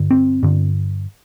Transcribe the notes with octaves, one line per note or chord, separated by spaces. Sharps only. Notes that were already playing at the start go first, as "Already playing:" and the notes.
Already playing: G2 D3
C4
G2 D3